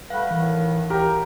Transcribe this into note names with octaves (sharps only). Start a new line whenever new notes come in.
G3 A3 B4 F5 F#5
A2 D#3 E3
G4 A#4 G5